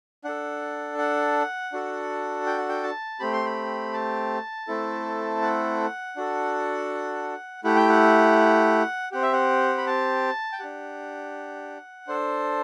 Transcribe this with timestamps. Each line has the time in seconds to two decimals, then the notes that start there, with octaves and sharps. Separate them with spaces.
0.24 D4 A4 F#5
0.99 F#5
1.73 D4 F#4 A4
2.46 G5
2.58 F#5
2.69 G5
2.83 A5
3.20 A3 C4 G4 B5
3.33 C6
3.46 B5
3.93 A5
4.68 A3 C4 E4 A4
5.42 F#5
6.16 D4 F#4 A4
7.64 A3 E4 G4 F#5
7.76 G5
7.89 F#5
9.12 C4 G4 F#5
9.22 E5
9.33 F#5
9.78 B5
9.87 A5
10.52 G5
10.59 D4 G4 F#5
12.07 D4 A4 C5